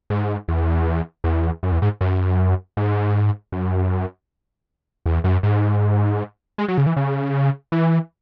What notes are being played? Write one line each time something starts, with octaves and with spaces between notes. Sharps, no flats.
G#2
E2
E2
F#2
E2
G#2
F#2
G#2
F#2
E2
F#2
G#2
G#3
F#3
C#3
E3
C#3
E3